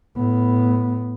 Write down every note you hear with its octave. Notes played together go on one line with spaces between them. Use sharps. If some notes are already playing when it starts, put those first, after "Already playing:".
A2 B3